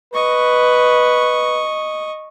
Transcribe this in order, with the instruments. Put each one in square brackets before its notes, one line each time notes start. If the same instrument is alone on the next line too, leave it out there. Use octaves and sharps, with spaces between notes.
[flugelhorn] B4 [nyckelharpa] D#5 C#6